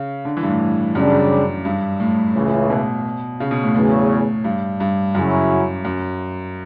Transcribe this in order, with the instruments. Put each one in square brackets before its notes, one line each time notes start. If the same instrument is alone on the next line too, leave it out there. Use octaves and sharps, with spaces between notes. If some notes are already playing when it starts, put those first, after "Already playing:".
Already playing: [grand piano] C#3
D3
E3
G2
A2
[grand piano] F#2 [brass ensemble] C#3 G3 D4
[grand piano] G2
A2
[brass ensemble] C#2 C#3 E3
[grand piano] B2
C#3
B2
A2
[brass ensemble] E2 C#3 F#3 [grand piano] A2
[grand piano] G2
G2
[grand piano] F#2 [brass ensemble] C#3 F#3 C#4 E4
[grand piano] F#2